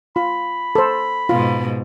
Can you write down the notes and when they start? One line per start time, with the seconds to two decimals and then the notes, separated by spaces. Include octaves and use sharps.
0.16 F4 B5
0.75 A4 C5
1.29 G#2 B2 F4